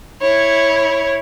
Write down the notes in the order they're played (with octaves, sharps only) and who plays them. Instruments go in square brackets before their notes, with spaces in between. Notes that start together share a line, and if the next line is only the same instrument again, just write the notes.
[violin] E4 C#5